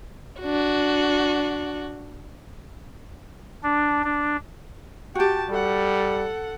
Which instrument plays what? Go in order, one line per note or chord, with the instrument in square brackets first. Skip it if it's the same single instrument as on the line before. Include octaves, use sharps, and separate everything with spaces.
[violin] D4 F#4
[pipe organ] D4
D4
[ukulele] F#4 G4 [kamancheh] G5 A5
[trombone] G3 [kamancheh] A4 F#5